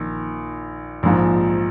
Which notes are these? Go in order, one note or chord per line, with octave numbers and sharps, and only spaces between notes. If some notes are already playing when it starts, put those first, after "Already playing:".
Already playing: A#1 D#3
A#1 G#2 F3